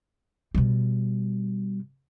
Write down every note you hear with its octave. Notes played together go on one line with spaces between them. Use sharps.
B2 G3